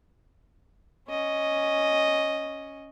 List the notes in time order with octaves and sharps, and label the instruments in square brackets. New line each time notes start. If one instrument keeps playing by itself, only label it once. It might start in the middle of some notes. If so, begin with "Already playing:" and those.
[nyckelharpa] C#4 D#5